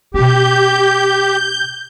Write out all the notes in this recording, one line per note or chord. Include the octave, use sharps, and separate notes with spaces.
B2 C#4 G4 G6